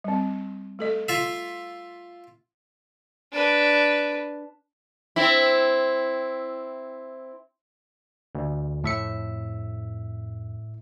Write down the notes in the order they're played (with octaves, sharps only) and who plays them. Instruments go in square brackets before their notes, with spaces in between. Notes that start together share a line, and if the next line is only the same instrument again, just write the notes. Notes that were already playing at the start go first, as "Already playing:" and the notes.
[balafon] G3 C4
A3 A4 D#5
[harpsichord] F4 E5
[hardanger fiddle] D4 B4
[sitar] C4 E4
[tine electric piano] D2
[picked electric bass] F2 [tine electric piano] A2 E5 C#7